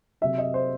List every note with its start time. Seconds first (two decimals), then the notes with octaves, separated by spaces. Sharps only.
0.21 C3 F#3 E5
0.38 D#5
0.54 C5